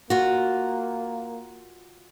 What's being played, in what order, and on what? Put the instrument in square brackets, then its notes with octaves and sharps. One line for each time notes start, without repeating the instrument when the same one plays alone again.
[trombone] A#3 [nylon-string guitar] F4 F#4